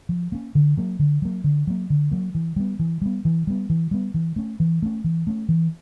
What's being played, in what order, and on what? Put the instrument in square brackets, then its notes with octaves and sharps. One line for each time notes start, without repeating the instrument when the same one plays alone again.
[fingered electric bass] F3
A#3 C#4
D3
F#3 A#3
D3
F#3 A#3
D3
F#3 A#3
D3
F#3 A#3
E3
G3 B3
E3
G3 B3
E3
G3 B3
E3
G3 B3
E3
A3 C#4
E3
A3 C#4
E3
A3 C#4
E3